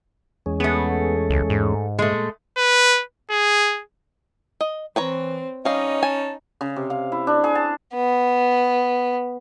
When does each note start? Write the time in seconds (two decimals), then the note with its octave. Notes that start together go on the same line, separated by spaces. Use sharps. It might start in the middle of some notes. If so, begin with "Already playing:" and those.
0.46 E2 G#3 C#4
0.60 A3 B3 G#4
1.30 C#2
1.50 G#2
1.99 A#2 G#3 A3
2.58 B4
3.31 G#4
4.61 D#5
4.96 E3 C4 B4 C#5 A#5
5.65 G3 C#4 D#4 D#5 F5
6.03 G#5 A5
6.61 C#3
6.76 C3
6.90 F5
7.12 E4
7.27 D4
7.44 G#4
7.55 A5
7.95 B3